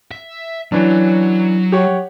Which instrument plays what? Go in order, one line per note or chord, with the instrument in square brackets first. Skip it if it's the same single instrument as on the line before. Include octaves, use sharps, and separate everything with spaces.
[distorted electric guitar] E5
[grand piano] E3 C#4 D4 [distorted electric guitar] F#3
[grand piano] G4 C#5 F#5